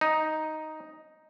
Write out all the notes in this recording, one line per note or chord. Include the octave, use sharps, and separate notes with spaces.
D#4